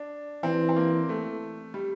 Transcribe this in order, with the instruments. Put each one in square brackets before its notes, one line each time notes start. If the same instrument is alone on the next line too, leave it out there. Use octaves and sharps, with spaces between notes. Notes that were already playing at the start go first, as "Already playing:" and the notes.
Already playing: [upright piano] D4
[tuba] E3 [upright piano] C4
[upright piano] C4
A#3
A3
G3